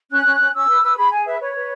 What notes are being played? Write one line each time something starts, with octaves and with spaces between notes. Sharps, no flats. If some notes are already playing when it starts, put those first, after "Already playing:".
C#4 F#6
C#4
C#4
C#4 E6
B4
B4
G#4 B5
G#4 G#5
B4 E5
B4 C#5
B4